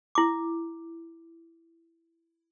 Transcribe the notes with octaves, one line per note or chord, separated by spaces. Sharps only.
E4 D6